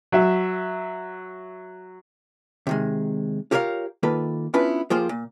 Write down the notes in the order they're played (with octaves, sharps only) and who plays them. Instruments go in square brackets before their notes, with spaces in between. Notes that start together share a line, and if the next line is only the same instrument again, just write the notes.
[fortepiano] F#3 F#4 E5
[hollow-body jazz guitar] C3 D#3 G#3
F4 G4 A#4 C#5 D#5 F5
D#3 A#3 F4 A4 B4
B3 C#4 D4 E4 F4 B4
F3 A#3 F4 G4 G#4 C5
A#2